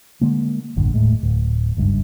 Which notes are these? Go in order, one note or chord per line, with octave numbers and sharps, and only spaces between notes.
D3 G#3 A#3
D#1 A1 F#2 D3
D#1 A2 G#3
D1
F#1 C#2 G2